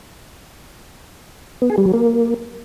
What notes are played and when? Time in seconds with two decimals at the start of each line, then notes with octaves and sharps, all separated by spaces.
1.62 B3
1.70 G#4
1.78 G3
1.86 F#3
1.93 A#3